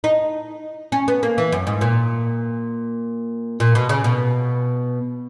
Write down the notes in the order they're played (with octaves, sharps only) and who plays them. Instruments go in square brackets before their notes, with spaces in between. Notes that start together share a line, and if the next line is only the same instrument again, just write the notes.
[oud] D#4
C#4
B3
A#3
E3
F#2
G#2
A#2
A#2
B2
C#3
B2